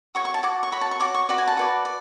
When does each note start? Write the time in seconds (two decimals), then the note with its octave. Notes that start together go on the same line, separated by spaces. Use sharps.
0.15 F#4 C#5 C#6
0.25 C#6
0.34 A5
0.43 F#4 C#5 D6
0.63 C#6
0.72 F#4 C#5 B5
0.81 A5
0.91 C#6
1.00 F#4 C#5 D6
1.14 C#6
1.29 F#4 B4 D5 B5
1.38 G#5
1.47 A5
1.57 F#4 B4 D5
1.85 D5